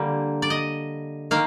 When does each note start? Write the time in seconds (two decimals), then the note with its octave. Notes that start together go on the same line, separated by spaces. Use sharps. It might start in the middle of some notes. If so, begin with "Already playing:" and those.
Already playing: D3 G3 A#3
0.42 D5
0.50 D#5
1.31 D#3 A#3 F5